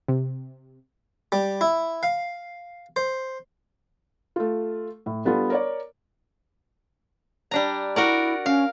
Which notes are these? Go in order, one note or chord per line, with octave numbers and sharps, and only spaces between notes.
C3
G3
E4
F5
C5
A3 F4
A2
G3 B3 D4 F4 A4
A#4 C#5 D5
G3 D4 A#5
E4 F#4 A#4 D5
C#4 F5